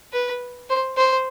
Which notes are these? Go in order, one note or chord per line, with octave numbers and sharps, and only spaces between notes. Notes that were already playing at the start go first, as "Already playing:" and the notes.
B4
C5
C5